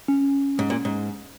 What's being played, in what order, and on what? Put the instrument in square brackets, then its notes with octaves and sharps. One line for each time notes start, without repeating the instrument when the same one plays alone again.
[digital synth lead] C#4
[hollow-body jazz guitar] G#2
A#2
G#2